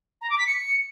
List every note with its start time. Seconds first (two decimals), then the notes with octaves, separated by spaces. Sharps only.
0.21 A#5
0.30 D6
0.38 B6
0.47 C#7